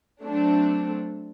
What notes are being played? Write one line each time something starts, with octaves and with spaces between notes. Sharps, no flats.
F#3 A3 C4 D4